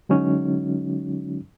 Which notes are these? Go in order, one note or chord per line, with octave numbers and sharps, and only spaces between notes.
D3 F#3 G#3 C#4 D#4 F#4